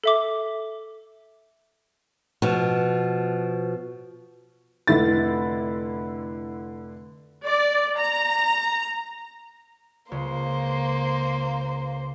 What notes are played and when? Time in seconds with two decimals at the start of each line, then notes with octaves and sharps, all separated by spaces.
0.04 A4 E5 D6
2.42 B2 F3
4.87 F1 D3 E4 A6
7.44 D5
7.97 A#5
10.12 C#2 A#3 C5